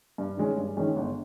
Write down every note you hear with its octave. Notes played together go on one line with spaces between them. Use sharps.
G2
D#3 G#3 C#4
G2
D#3 G#3 C#4
G1